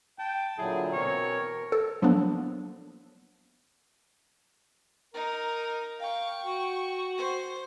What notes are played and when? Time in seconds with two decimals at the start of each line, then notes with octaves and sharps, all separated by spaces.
0.19 G5 A5
0.58 A#2 D3 F#3 E4 G#4
0.93 B2 E3 C4 A#4 C#5
1.72 A4
2.02 F3 F#3 A#3 B3 D4
5.14 D#4 A#4
6.00 F5 G5 C#6
6.45 F#4
7.17 C5